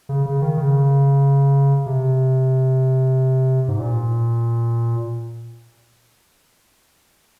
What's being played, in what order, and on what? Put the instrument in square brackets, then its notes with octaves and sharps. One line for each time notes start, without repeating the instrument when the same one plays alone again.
[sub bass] C#3
C#3
D#3
C#3
C3
G#2
A#2